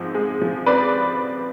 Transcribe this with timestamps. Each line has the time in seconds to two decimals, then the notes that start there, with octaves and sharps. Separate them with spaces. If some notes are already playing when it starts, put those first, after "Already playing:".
Already playing: G#2 F3 C4
0.15 G#3
0.42 F3
0.66 C4 B4 D5